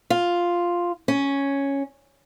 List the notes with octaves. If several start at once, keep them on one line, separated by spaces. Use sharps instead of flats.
F4
C#4